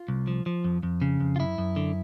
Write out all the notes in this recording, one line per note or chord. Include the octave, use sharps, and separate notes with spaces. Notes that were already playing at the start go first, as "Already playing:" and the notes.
Already playing: F4
C2
F3
F3
F2
F2
C#3
F2
F4
F#2 E4
F#2
D3